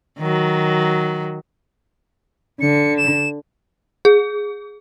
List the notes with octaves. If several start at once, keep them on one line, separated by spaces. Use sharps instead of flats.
D#3 F#3
D3 C#7
E7
G#4